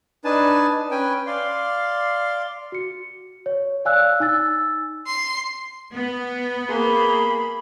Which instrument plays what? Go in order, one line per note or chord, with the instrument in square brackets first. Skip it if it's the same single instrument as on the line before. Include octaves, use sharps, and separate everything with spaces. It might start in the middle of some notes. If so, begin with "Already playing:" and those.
[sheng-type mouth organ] D4 D#4 B4 G#5 A5
C#4 B4 G5 G#5
D5 F5 C6
[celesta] F#4 C#7
C#5
D5 F5 G#5 E6 F#6
D#4 G#5 E6 A6
[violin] C6
[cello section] B3
[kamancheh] A#3 [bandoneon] G#4 C6 [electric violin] B5